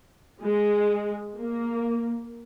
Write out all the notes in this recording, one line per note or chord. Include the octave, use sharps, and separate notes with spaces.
G#3
A#3